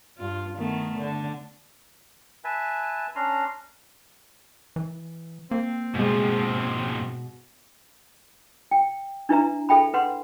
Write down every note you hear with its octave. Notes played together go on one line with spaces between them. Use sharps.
G2 F4
D#3 A3 B3
D3
B4 E5 G#5 A5
C#4 D4 A#5 C6
E3
A#3 C4
G#2 B2 F3 G#3
G5
D4 E4 B4 E5 A#5
A4 E5 G5 B5
B4 F#5 C6